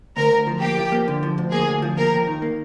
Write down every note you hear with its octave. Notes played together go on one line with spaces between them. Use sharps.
D2 A#4
D2
F3
A#3 G4
F3
A#3
D3
F3
D2
A#3 G#4
D2
F3
A#3 A#4
D#2
D#3
A#3